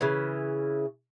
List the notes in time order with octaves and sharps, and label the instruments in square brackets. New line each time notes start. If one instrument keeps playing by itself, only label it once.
[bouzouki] C#3 E3